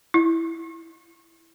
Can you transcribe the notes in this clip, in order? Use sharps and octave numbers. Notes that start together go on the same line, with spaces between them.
E4